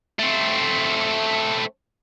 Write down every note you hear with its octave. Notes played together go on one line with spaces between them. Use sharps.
A3 C4